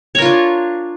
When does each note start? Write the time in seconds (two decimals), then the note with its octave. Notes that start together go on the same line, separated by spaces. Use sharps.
0.15 C#5
0.18 A#4
0.22 F4
0.26 D4